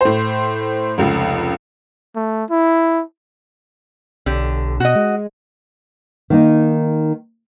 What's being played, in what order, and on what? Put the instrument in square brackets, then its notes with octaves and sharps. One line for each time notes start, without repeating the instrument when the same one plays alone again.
[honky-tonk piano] A2 C5
F1 C#2
[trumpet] A3
E4
[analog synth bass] B1 [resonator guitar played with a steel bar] D3 G4
[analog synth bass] B2 [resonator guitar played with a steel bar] F#4 D#5
[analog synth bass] G#3
[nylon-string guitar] D#3 A#3 D#4